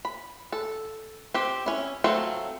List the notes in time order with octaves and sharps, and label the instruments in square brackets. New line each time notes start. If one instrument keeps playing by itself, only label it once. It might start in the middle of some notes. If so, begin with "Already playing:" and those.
[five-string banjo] B5
A4
C4 G4
C#4 E4
F#3 A3 C4 F4